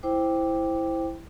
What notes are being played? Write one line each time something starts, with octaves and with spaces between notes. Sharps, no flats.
E4 C5 G5 D6